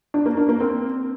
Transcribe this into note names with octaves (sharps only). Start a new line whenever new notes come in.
D4
A#3
D4
A#3
C4